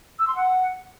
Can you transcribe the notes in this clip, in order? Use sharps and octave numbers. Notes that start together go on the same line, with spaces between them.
E6
C6
F#5